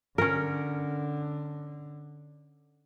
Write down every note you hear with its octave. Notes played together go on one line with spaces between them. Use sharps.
D3 C#4 A#4